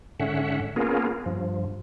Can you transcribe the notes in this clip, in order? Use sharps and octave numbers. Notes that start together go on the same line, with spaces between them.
G#2 D3 C#4 E5 F#5
A#3 B3 C#4 F4 G#4 A#4
G2 F3